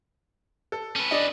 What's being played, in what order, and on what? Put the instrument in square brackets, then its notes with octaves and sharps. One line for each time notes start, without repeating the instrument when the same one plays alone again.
[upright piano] A4
[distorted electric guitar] C#4 B4
[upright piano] D4 D5 D#5